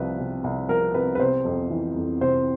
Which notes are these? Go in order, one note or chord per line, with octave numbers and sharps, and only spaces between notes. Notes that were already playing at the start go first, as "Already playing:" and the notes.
Already playing: C2 C3 F3 B4
C3
C2
F3 A#4
C2 B4
B4
C3 C5
F2
E3
F2
C3 C5